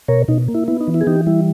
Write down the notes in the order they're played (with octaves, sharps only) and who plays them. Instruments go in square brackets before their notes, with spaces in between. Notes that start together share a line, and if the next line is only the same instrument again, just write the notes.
[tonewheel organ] B2 A#4 C#5
B2 D#4
A#3
E4
B3 E4
D#4
E3
E4
G#4
E3 D#4 G4
G3 E4